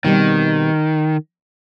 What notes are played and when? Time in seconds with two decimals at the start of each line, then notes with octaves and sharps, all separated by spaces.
0.04 B2 D#3 G3 C4